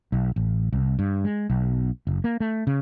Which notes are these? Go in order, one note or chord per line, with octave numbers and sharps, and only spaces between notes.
B1
A1
C2
G2
G#3
B1
F#1
A#3
A3
C#3